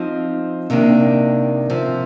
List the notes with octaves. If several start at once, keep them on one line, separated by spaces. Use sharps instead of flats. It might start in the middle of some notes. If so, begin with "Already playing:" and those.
Already playing: F3 C4 D#4
C3 D#3 A#3 D4
C3 F3 C4